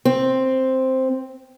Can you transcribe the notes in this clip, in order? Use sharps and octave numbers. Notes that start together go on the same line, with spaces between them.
C4